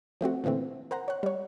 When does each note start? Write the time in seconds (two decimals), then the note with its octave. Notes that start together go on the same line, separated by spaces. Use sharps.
0.21 F3 A3 C4 F#4
0.44 A#2 D3 E3 A3 C4
0.91 A#4 C5 F#5 A#5
1.08 C#5 F#5
1.23 G3 C#5